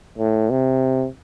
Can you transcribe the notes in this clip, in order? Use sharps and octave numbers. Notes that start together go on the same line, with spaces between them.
A2
C3